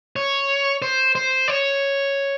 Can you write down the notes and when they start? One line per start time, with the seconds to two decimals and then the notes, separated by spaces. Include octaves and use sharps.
0.16 C#5
0.82 C5
1.15 C5
1.48 C#5